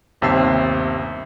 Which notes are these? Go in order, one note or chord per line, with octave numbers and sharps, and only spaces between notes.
G1 D#2 C3 E5 E6 C7